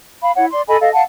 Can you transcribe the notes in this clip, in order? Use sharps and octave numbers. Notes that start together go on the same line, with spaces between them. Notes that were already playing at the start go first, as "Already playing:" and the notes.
F5 B5
E4 C#5 F#5
D5 C6
A4 D#5 G#5 B5
A4 D#5 F5
F5 F#5 A5